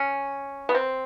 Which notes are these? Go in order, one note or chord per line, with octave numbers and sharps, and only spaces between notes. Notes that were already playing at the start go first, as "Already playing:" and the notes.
Already playing: C#4
B3
C4